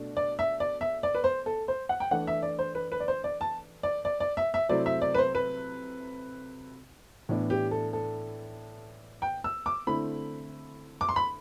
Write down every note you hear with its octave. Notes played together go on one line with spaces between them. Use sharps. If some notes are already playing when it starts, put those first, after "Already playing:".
Already playing: B2 A3 D4
D5
E5
D5
E5
D5
B4
C5
A4
C5
F#5
G5
E3 A3 D4 F#5
E5
D5
C5
B4
B4
D5
C5
D5
A5
D5
D5
D5
E5
E5
C3 F#3 A3 C4 E4 D5
E5
D5
B4
C5
B4
A2 E3 B3 D4
G4
A4
A4
G5
E6
D6
D3 A3 C4 E4 B5
D6
C6
B5